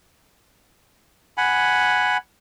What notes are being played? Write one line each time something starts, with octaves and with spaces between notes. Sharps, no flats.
F#5 G#5 B5